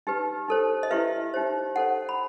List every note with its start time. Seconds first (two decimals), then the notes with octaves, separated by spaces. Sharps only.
0.07 D#4 G4 B4
0.48 D#4 A4 C5
0.83 D#5
0.91 E4 G4 B4 E5
1.34 D#4 G4 C5
1.76 D#4 A4 C5 F#5
2.09 B5